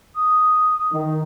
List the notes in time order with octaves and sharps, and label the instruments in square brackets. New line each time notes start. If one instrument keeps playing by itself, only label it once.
[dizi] D#6
[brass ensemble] D#3